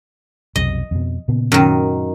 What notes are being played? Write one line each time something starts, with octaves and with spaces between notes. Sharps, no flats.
B1 F2 C3 D#5
F2 B2
A#2 C#3 B3
F#2 D#3